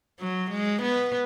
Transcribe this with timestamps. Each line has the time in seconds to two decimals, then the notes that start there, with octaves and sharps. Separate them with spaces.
0.20 F#3
0.51 G#3
0.82 B3